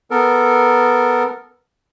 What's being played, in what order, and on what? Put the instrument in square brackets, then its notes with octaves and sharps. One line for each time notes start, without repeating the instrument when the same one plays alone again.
[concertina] B3 A4 A#4